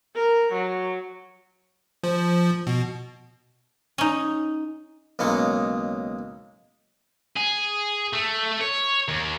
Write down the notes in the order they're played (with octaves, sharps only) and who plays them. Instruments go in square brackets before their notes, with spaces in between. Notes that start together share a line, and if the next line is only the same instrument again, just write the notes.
[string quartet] A#4
F#3
[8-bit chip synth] F3
B2
[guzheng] C#4 D#4
[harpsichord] B1 C#3 G#3 A#3 C#6
[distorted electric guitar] G#4
A3
C#5
D#2